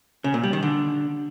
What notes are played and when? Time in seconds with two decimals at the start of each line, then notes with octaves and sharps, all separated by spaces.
0.24 C#3
0.34 A#2
0.43 G3
0.53 D#3
0.63 D3